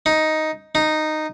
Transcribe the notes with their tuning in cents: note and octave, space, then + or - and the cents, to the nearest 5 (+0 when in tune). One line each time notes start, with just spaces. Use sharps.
D#4 +5
D#4 -10